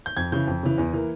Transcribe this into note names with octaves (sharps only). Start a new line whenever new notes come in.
G6
F2 G#6
C#3 E3 G6
F2
C#3 E3
E2
E3 A#3